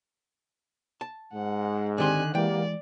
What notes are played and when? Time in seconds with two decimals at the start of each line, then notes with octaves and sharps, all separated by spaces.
1.01 A5
1.33 G#2 G#3 F#5
1.98 D3 D#3 C4 G4 D5 G#5 C6 F#6
2.35 E3 G#3 A#3 B3 G4 D5 G5